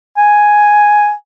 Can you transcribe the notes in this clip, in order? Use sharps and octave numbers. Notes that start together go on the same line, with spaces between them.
G#5